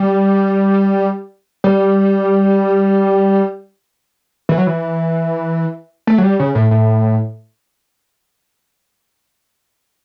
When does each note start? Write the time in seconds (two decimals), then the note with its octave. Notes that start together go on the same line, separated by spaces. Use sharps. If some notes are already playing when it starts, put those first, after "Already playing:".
Already playing: G3
1.64 G3
4.49 E3
4.58 F#3
4.67 E3
6.07 A3
6.18 F#3
6.23 G3
6.40 C#3
6.55 A2
6.71 A2